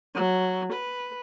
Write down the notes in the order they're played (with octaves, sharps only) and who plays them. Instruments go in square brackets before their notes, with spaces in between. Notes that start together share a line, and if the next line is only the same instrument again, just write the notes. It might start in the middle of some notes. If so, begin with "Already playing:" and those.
[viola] F#3
B4